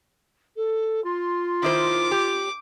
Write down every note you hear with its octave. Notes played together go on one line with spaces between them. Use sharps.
A4
F4 C6
D#3 E4 C5 D6
G4